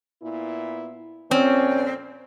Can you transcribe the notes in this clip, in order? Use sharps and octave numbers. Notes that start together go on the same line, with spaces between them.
A#2 B3 E4
F2 A#2 C4 C#4 D5